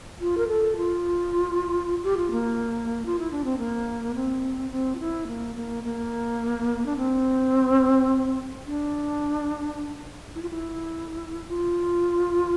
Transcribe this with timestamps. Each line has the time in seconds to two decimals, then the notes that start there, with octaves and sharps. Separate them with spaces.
0.20 F4
0.37 A#4
0.48 A4
0.76 F4
2.03 G4
2.17 F4
2.31 A#3
3.06 F4
3.19 E4
3.31 D4
3.44 C4
3.58 A#3
4.15 C4
4.71 C4
4.95 F4
5.00 E4
5.27 A#3
5.55 A#3
5.84 A#3
6.86 D4
6.97 C4
8.66 D4
10.35 E4
10.42 F4
10.50 E4
11.48 F4